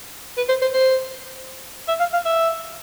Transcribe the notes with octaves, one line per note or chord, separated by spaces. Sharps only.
B4
C5
C5
C5
E5
F5
F5
E5